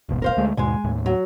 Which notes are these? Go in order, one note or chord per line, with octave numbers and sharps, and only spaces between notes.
D#1 G#1 B2
A#4 C5 F5
D2 G#3 A3
D#2 G#2 B2 G#3 G#5
D#2 A2
F#3